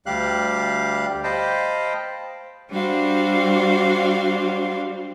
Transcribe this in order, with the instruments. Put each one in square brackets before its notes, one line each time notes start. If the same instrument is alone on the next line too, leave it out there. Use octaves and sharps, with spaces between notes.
[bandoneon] D2 G3 G4 F5 F#6
C5 D#5 F5 G5 A5 B5
[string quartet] G3 D4 F#4 C5 F5